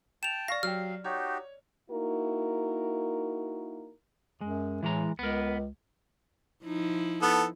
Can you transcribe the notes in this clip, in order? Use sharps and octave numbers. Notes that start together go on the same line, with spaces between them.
G5 A5 E7 F7
D5 F5 C#6 A#6
F#3 G4 F5 F6
D#4 F#4 G4 C#5
A#3 D#4 E4 F#4 A#4
F#2 G#3
A2 E3 G#3 A#5
C#2 B3 A#4
F3 D#4 E4
B3 A4